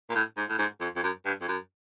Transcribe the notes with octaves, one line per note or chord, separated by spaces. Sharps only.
A#2
A2
G#2
A2
G#2
F2
F2
F#2
G2
F2
F#2